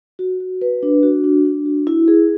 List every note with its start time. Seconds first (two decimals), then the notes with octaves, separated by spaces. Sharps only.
0.19 F#4
0.40 F#4
0.62 B4
0.83 D4
1.03 F#4
1.24 D4
1.45 D4
1.66 F#4
1.87 E4
2.08 G#4